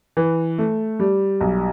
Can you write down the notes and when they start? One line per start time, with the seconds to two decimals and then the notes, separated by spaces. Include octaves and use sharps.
0.17 E3
0.58 A3
1.00 G3
1.41 B1